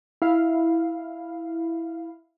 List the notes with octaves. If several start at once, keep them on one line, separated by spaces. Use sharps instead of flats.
E4 F5